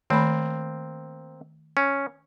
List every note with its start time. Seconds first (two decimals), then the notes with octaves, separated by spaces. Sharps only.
0.10 D#3 A3 A#3 C4 B5
1.77 C#4